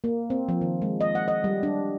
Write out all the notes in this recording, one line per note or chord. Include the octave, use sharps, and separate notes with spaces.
A#3
C4
F3
D#3
G#3
D#5
F#5
D#5
G3
D4